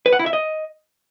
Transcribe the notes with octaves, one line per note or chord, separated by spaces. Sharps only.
B4
F#5
E4
E5
D#5